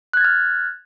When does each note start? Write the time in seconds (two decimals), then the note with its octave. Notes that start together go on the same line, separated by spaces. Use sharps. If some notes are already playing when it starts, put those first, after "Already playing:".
0.13 F#6
0.17 G#6
0.21 A6
0.24 F6